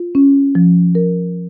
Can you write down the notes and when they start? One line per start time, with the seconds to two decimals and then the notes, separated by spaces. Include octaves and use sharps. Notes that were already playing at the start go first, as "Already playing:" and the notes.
Already playing: F4
0.15 C#4
0.55 F3
0.95 A#4